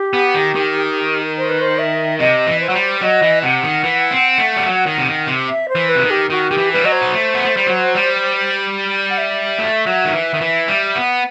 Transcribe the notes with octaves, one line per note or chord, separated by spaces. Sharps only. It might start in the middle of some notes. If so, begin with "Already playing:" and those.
Already playing: G4
B3
D#3
D#3
C5
B4
C5
E5
C3 D#5
E3
C5
F#3
G3
F#3 D#5
E3
C3 F#5
D#3
E3
C4
A3
G3
F#3
D#3
C3
D#3
C3
E5
C5
E3
B4
C3
D#3
G4
D#3 F#4
D#3 G4
E3
G3 B4
F#3 D#5
C5
B3
A3
B3
A3
G3
F#3
G3
F#5
E5
A3
F#3
D#3
E3
D#3
E3
G3
B3